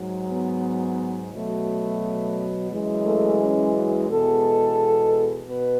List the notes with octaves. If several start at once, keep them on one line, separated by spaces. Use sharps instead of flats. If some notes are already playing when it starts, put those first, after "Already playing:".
Already playing: G#2 F#3
B3
B2 F#3 A3
F#2 E3 G#3
A3
C#4
F#4
E2 B2 G#3 A4
B2 B4